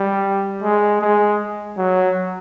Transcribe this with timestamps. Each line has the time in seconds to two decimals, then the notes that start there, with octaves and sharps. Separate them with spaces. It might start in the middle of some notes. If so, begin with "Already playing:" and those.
Already playing: G3
0.63 G#3
1.02 G#3
1.78 F#3